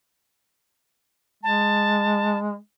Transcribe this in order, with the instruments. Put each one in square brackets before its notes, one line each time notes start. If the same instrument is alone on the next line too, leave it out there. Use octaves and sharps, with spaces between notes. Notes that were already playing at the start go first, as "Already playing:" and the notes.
[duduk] G#3 [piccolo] A5